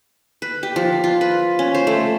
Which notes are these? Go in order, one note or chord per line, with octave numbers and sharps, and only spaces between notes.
B4
G4
F3
F4
B4
C#4
C5
A3